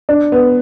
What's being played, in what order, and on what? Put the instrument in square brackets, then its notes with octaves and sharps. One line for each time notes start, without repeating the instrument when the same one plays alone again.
[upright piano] D4
B3